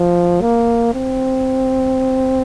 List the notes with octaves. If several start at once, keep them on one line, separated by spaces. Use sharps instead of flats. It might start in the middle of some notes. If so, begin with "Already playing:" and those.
Already playing: F3
A#3
C4